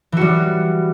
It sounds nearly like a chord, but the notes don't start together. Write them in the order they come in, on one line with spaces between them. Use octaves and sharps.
E3 F#4 G3